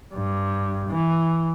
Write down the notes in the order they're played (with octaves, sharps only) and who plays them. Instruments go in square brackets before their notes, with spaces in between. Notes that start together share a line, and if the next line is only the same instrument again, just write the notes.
[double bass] G2
E3